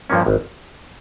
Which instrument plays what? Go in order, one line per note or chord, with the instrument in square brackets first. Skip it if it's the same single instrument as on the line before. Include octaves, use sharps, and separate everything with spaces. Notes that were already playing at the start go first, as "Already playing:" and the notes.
[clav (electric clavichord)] G2 F3 A#3 C#4
G#1